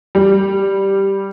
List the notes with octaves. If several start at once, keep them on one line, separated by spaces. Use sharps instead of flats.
G3